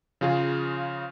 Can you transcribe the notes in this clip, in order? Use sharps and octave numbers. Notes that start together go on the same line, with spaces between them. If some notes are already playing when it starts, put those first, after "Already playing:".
C#3 F3 F4 G#4